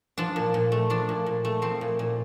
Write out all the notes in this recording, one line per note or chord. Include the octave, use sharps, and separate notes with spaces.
F3 D4
A#2
A#2
A3
F3 D4
A#2
A#2
A3
F3 C4
A#2
A#2